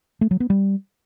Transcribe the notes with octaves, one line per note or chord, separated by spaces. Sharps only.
A3
F#3
B3
G3